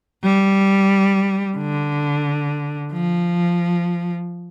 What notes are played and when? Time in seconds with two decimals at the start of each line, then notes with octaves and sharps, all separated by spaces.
0.24 G3
1.58 D3
2.92 F3